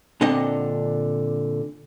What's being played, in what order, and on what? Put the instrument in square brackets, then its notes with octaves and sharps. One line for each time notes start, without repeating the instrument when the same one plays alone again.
[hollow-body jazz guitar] A#2 D3 C4 D4 D#5 F#5